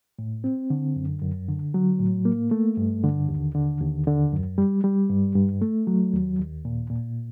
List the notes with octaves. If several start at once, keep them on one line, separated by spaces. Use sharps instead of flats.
A2
C4
D3
F#2
F#2
D3
F#3
A2
A#3
A3
G2
D3
D#2
D3
D#2
D3
F#2
G3
G3
G2
G2
A3
F#3
D#2
D#2
A#2
A#2